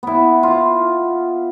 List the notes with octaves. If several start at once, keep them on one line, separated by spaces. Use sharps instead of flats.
B3 E4
F4